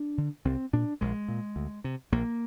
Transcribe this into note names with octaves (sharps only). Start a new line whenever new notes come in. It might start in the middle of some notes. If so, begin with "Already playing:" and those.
Already playing: D4
D3
C2 C4
A#2 D4
A#1 G#3
A#2
D2
C3
A#1 A#3